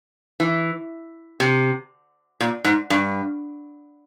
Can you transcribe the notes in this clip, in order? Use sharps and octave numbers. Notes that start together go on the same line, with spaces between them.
E3
C3
A#2
G#2
G2